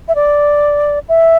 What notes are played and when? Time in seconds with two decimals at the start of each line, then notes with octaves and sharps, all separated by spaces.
0.08 E5
0.15 D5
1.09 E5